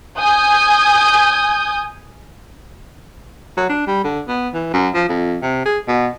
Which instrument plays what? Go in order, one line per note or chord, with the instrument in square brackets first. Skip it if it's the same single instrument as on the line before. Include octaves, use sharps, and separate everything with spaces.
[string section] G#5 D#6 G6
[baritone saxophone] F#3
D4
G3
D3
B3
E3
F#2
F3
F2
C3
G#4
B2